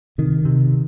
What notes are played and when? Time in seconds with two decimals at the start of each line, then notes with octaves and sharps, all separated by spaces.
0.18 C3 D#3
0.45 C3